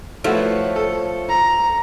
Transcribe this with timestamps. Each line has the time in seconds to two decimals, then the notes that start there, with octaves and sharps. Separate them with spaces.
0.24 F3 A3 E4 F#4 B4 C#5
0.76 A4
1.29 A#5